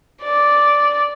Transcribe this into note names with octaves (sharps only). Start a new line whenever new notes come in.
D5